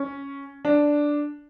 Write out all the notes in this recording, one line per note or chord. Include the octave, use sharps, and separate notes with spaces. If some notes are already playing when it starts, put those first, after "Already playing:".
Already playing: C#4
D4